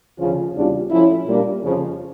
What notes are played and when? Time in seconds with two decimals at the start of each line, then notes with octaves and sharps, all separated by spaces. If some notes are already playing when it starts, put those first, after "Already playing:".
0.18 D2 C#3 F3 C#4 F4
0.54 E2 C#3 G3 D4 F4
0.91 A2 F3 C#4 E4
1.26 A#2 G3 A#3 D4
1.63 F2 C#3 F3